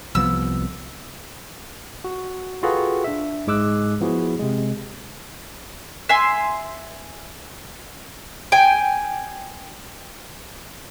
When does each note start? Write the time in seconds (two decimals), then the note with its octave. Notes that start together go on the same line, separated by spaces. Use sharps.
0.15 C2 F3 B3 E6
2.04 F#4
2.63 F4 F#4 G#4 A4 B4 G5
3.04 D4 E5
3.47 G#2 G#3 D6 E6 F#6
4.01 F3 B3 E4 F#4 G#4
4.39 C3 G#3
6.09 E5 G#5 C6
8.52 G5 G#5